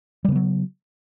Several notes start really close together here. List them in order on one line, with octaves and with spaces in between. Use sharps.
G3 C#3 B3 F#3